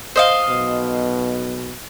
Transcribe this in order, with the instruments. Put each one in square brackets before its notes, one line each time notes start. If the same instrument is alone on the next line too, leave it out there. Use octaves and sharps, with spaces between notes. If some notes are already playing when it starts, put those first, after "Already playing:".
[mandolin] C5 D#5 F5
[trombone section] B1 B2